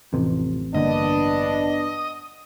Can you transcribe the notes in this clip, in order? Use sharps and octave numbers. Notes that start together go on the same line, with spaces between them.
A1 F2 C3
G2 D3 A#3 B3 D4 D#5